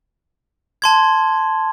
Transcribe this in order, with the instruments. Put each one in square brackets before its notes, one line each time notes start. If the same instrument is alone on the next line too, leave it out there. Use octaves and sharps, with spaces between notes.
[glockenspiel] A5 C6 G#6